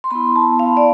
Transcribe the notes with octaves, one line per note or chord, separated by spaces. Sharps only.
C6
B3 E4 B5
A5
F5
D5